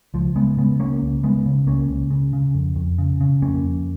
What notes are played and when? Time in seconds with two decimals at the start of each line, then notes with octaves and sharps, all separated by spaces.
0.14 C#2 F3
0.36 C#3 G#3 B3
0.57 C#3 G#3 B3
0.80 C#2 A#3 C#4
1.02 C#2
1.23 C#3 G#3 B3
1.46 C#3
1.67 C#2 A#3 C#4
1.89 C#2
2.11 C#3
2.33 C#3
2.55 F2
2.76 F2
2.98 C#3
3.21 C#3
3.42 F2 A#3 C#4
3.64 F2